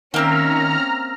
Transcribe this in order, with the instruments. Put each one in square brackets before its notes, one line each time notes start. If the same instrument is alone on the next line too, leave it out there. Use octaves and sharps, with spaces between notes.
[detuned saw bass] D#3 [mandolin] A#3 C4 E5 [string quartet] C#4 [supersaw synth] A#5 F6